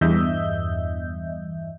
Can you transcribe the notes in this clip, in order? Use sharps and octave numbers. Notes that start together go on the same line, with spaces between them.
E2 G2 D#5 E5 G6